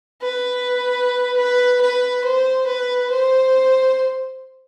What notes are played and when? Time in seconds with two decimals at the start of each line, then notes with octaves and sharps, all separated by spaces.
0.22 B4
1.37 B4
1.81 B4
2.24 C5
2.67 B4
3.11 C5